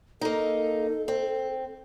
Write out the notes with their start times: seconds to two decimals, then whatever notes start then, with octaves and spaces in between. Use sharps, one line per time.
0.21 A#3 D#4 A4
1.08 C4